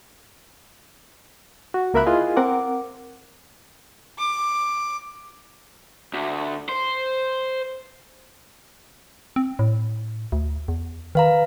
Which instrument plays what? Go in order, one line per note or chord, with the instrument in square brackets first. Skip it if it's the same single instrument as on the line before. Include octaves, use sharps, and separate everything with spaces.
[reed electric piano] F#4
C#2 A#3 A#4 E5 B5 F#6
E4 F4 G#4 D#5 F5 G#5
C4 A#4 F#5 D6
[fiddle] D6
[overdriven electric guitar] D2
C5
[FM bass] C4
A2
D2
E2
[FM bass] D#3 [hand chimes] B4 F5 A#5